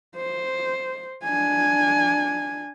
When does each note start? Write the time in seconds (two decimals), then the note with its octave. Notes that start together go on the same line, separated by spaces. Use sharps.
0.16 C5
1.24 D4 G#5